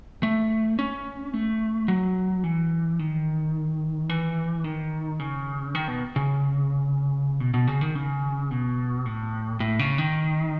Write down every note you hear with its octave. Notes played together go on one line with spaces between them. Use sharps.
A3
C#4
A3
F#3
E3
D#3
E3
D#3
C#3
D#3
B2
C#3
B2
B2
C#3
D#3
C#3
B2
A2
A2
C#3
D#3